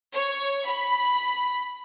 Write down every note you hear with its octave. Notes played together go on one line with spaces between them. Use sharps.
C#5
B5